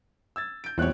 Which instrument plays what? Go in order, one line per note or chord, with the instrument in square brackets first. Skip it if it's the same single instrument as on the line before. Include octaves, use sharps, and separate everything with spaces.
[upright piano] E6 G#6 A6
[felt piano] G6 D7
[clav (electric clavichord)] E2 [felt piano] A#2 G3 C#5 [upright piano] C4 F#6